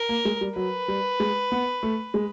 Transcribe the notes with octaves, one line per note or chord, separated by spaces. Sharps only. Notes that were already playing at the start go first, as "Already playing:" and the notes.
Already playing: A#4
A#3
G#3
G3
F#3 B4
G3
G#3
B3
A3
G#3